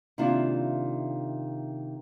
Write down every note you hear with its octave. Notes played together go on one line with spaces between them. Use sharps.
C3 D#3 A#3 D4 E4 F4